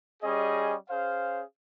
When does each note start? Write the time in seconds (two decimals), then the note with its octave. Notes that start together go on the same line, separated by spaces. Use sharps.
0.23 G3 C#4 G#4 D#5
0.90 C#4 G#4 C5 F5